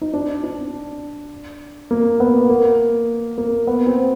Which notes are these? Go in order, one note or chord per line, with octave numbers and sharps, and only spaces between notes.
D#4
D4
D4
A#3
B3
A#3
A#3
B3
C4